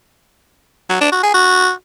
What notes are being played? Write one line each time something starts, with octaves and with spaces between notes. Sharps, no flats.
F#3
D4
F#4
G#4
F#4